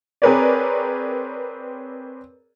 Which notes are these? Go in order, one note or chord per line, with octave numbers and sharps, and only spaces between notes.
C4 G#4 A#4 B4 C#5 D5